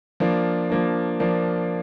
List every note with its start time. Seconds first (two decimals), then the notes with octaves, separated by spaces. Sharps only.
0.20 F3 A#3 D4
0.70 F3 A#3 D4
1.20 F3 A#3 D4